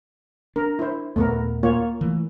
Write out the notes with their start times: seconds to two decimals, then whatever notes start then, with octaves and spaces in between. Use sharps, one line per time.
0.56 D4 A#4
0.79 E4 C5
1.16 D#2 A#2 A3 B3 A#4
1.63 A#3 F4 C#5
2.01 E3 A3